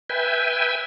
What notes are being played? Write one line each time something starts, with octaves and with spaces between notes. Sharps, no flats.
B4 E5 G5 G#5